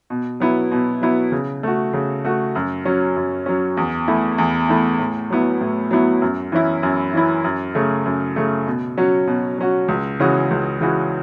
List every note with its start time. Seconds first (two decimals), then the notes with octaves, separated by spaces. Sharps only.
0.10 B2
0.40 F#3 B3 E4
0.71 B2
1.02 F#3 B3 E4
1.32 C#3
1.63 A3 F#4
1.93 C#3
2.24 A3 F#4
2.55 F#2
2.85 F#3 C#4
3.16 F#2
3.46 F#3 C#4
3.77 E2
4.08 E3 A3 E4
4.38 E2
4.69 E3 A3 E4
4.99 A2
5.30 F#3 B3 E4
5.61 A2
5.91 F#3 B3 E4
6.22 F#2
6.52 E3 C#4 E4
6.83 F#2
7.13 E3 C#4 E4
7.44 F#2
7.75 C#3 A3
8.06 F#2
8.36 C#3 A3
8.67 B2
8.97 F#3 C#4 F#4
9.27 B2
9.58 F#3 C#4 F#4
9.88 C#2
10.20 C#3 E3 C#4 F#4
10.51 C#2
10.81 C#3 E3 C#4 F#4